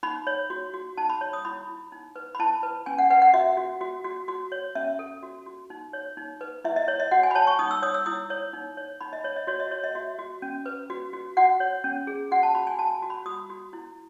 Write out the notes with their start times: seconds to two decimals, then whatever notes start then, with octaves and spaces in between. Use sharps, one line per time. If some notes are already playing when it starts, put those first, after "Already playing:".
0.03 D#4 B5
0.27 C#5
0.50 F#4
0.74 F#4
0.97 D#4 A5
1.10 B5
1.21 C#5
1.33 D#6
1.45 E4 B5
1.68 E4
1.92 D#4
2.16 B4
2.35 B5
2.39 E4 A5
2.63 B4
2.86 C#4 G#5
2.98 F#5
3.10 B4 F#5
3.22 F#5
3.34 F#4 E5
3.57 F#4
3.81 F#4
4.04 F#4
4.28 F#4
4.52 C#5
4.75 C#4 E5
4.99 A4
5.23 F#4
5.46 F#4
5.70 D#4
5.93 C#5
6.17 D#4
6.41 B4
6.64 E4 E5
6.76 D#5
6.88 C#5
7.00 D#5
7.11 F#4 F#5
7.23 G#5
7.31 B5
7.35 C#5 A5
7.47 C#6
7.59 D#4 D#6
7.71 E6
7.82 C#5 D#6
7.94 E6
8.06 E4 D#6
8.30 C#5
8.53 D#4
8.77 C#5
9.01 D#4 B5
9.13 D#5
9.24 C#5
9.36 D#5
9.47 F#4 C#5
9.60 D#5
9.71 F#4 C#5
9.84 D#5
9.95 F#4 E5
10.19 F#4
10.42 C#4
10.66 B4
10.90 F#4
11.13 F#4
11.37 F#4 F#5
11.60 C#5
11.84 C#4
12.07 G#4
12.31 F#4 F#5
12.43 A5
12.55 F#4 B5
12.67 G#5
12.78 F#4 A5
13.02 F#4
13.10 B5
13.26 F#4 D#6
13.50 F#4
13.73 E4